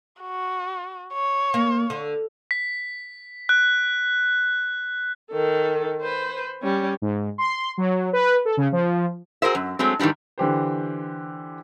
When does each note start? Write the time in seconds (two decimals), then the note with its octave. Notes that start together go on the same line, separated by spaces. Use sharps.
0.21 F#4
1.13 C#5
1.54 A#3
1.90 D3
2.51 B6
3.49 F#6
5.31 D#3 A4
6.02 B4 C5
6.62 G3 C#4
7.02 G#2
7.38 C6
7.78 F#3
8.13 B4
8.45 A4
8.57 C#3
8.72 F3
9.42 F#4 G#4 A#4 C5 E5
9.55 F#2
9.79 F#3 G#3 A3 C4
9.99 G#2 D#3 E3 G3 D4
10.38 D3 E3 G4 C5